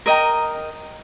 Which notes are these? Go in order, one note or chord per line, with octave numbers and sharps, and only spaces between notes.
A#4 D#5 G5 A#5